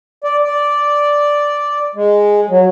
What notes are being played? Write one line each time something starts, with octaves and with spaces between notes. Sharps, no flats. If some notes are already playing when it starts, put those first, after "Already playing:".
D5
D5
G#3
F#3